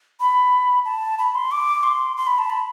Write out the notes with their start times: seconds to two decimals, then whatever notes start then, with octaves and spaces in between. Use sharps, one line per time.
0.20 B5
0.85 A5
1.19 B5
1.35 C6
1.51 D6
1.83 C6
2.17 C6
2.27 B5
2.39 A5
2.50 B5